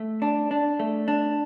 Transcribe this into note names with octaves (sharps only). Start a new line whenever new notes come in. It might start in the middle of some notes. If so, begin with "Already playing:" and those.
Already playing: A3
D4
D4
A3
D4